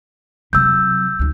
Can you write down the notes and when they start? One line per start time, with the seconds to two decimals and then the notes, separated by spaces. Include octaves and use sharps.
0.53 C3 F#3 E6 G6
1.19 D2 D#3